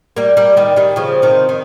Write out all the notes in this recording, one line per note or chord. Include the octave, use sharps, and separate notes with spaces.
G3 A#3
G3 A#3
D#3 G3
D#3 G3
C#3 F3
C3 D#3
D#3